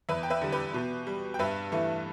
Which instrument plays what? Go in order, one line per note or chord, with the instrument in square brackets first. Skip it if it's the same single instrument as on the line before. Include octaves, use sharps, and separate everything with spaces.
[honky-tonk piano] E2 B4 E5
G5
B4 E5
D3 G3
G4 B4
B2
G3
G5
G2 B4 E5
E3 A3